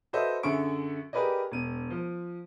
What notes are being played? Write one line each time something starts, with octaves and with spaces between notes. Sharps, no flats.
F#4 A4 B4 C5 D#5 E5
F#2 D3 G#4 E5 C#6 D7
G4 G#4 A#4 B4 D5 D#5
E1 D#7
F3